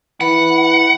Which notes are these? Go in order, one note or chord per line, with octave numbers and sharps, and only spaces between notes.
E3 F#5 B5